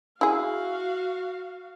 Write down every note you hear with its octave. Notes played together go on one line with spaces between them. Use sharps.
E4 F#4 G#4 F5